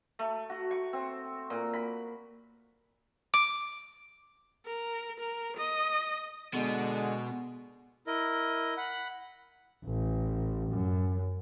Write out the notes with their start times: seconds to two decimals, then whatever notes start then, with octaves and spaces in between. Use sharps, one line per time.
0.19 A3
0.50 F#4
0.71 C#6
0.93 C4
1.50 A#2
1.73 B5
3.34 D6
4.66 A#4
5.19 A#4
5.57 D#5
6.54 B2 D3 G#3
8.07 E4 A#4 D#5
8.77 F#5 B5
9.85 A1
10.70 F#2